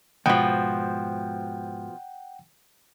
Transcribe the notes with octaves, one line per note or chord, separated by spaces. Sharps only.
D2 G#2 B2 F3 F#5 G5